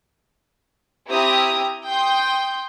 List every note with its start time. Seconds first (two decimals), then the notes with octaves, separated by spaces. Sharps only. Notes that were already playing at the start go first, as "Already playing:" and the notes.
1.07 C4 E4 G4 A#5 D#6
1.87 G5 C6 D#6 G6